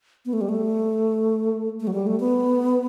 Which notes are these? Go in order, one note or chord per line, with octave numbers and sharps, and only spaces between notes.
B3
A3
G3
A3
A3
F#3
G3
A3
B3